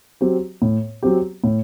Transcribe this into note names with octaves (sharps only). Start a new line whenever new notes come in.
F#3 C4 G4
A2
F#3 C4 G4
A2